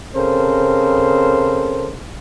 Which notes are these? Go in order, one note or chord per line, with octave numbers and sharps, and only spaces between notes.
C#3 C4 A4 A#4 C5